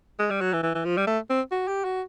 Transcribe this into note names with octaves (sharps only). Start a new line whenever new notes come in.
G#3
G3
F#3
E3
E3
E3
F3
G3
A3
C4
F#4
G4
F#4